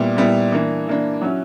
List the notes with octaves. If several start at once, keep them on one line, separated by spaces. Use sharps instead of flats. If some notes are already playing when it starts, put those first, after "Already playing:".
Already playing: A#2 G3 B3 E4
A#2 G3 B3 E4
E3 A#3 D4
E3 A#3 D4
F#3 C#4 E4